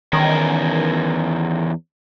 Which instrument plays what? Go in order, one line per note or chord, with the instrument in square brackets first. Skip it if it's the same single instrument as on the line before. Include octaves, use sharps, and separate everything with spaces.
[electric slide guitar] E2 C#4 A#4 [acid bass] D#3